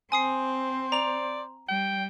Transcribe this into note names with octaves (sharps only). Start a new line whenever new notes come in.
C4 C5 G#5 D#6 C7
D5 A#5 F7
G3 G5